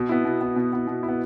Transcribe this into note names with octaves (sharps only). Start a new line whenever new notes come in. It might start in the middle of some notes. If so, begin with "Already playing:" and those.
Already playing: B2
B3 E4
B2
B3 E4
B2
B3 E4
B2
E4
B3